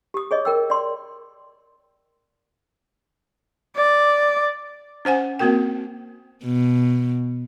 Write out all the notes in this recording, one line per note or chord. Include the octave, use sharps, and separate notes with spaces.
G4 D#6
G#4 C#5 D#5
A#4 G5 E6
D5 C6
D5
C#4 C5 F#5 G#5
A#3 C4 F#4 A#4 G5
B2